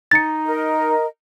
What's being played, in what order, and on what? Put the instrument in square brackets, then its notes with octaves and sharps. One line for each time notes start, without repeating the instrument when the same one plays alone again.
[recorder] D#4 [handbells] A6 C#7
[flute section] A#4 D#5